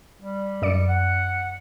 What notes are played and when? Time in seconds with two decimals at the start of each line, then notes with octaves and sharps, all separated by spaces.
0.21 G3
0.62 F#2 D5 C#7
0.88 F#5